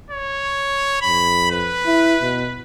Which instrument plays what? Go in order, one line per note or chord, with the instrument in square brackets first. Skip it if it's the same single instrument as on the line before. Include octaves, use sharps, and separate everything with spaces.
[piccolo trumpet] C#5
[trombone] F2 [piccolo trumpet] B5
[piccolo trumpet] B4
[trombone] E4
B2